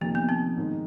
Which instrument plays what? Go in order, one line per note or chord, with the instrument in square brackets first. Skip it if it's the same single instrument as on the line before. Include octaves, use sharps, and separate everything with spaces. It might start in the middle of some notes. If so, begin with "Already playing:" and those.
[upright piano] F2 C3 D#3 [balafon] A#3
[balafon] B3
C4
[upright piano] G#2 D#3 G#3